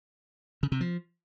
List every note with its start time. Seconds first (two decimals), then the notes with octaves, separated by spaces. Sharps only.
0.63 C#3
0.72 C3
0.81 F3